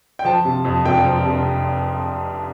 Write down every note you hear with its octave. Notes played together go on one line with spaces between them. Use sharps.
G5
F3 A5
C3
F2
F1 G5
F3
C3